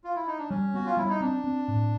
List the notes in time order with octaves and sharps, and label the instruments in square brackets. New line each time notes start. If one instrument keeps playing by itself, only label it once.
[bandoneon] F4
E4
D#4
D4
[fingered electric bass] G3 [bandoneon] C#4
[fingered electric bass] B3 [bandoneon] F#4
[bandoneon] F4
[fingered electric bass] G3 [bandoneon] E4
[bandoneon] D#4
[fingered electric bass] C4 [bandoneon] D4
[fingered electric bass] C4
A2